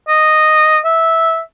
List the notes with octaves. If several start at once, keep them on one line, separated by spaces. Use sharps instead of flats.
D#5
E5